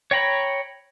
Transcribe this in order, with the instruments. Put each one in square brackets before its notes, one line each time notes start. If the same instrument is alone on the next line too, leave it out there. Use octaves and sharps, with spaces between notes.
[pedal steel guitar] C#5 G5 A#5 B5